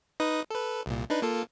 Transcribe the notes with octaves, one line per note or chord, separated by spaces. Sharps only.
D#4 B4 D#6
A4 B4
C2 A#2
D4 D#4 B4
A#3 F4 A4